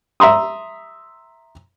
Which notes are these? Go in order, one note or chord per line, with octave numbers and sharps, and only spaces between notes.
E5 A#5 C6 D#6